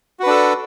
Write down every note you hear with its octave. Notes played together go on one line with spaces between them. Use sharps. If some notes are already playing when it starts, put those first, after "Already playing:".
D4 F#4 A4 B4